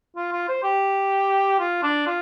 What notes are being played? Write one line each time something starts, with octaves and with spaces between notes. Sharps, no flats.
F4
F4
C5
G4
F4
D4
F4